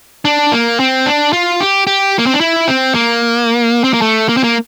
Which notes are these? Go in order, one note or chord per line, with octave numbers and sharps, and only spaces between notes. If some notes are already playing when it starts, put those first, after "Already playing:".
D4
A#3
C4
D4
F4
G4
G4
A#3
C4
D4
E4
C4
A#3
C4
A#3
A3
A#3
C4
A#3